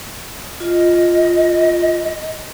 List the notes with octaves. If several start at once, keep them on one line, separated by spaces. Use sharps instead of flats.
F4 D#5